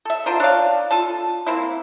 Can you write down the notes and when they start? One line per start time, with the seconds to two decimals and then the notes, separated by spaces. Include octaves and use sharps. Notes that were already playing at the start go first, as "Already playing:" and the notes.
0.05 A4 E5
0.26 D3 F4 A#4 C5
0.40 D4 C#5 F5
0.91 F4 A4 A5
1.46 A#3 C4 E4